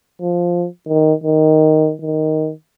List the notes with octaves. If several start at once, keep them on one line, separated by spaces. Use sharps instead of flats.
F3
D#3
D#3
D#3